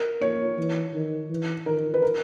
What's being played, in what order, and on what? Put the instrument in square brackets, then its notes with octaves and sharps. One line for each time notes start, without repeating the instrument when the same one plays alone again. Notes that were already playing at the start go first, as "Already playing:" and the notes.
Already playing: [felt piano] A#4
[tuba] A#3 [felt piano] C#5
[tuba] E3
D#3
E3
[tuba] D#3 [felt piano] A#4
[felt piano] B4
A#4